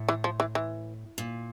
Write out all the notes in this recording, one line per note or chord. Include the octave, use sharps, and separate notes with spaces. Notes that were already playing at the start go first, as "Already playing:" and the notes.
Already playing: A2
E3
F3
E3
E3
A#2